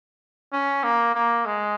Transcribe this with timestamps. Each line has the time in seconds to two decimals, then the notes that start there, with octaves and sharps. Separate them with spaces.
0.52 C#4
0.83 A#3
1.15 A#3
1.46 G#3